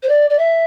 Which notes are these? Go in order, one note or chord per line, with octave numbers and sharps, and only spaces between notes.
C5
D5
D5
E5